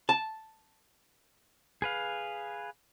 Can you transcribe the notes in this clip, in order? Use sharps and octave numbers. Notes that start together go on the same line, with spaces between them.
A5
G#4 B4 F5